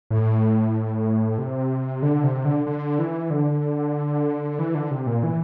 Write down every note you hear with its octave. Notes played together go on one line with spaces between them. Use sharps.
A2
C3
D3
C3
D3
D3
E3
D3
E3
D3
C3
A#2
E3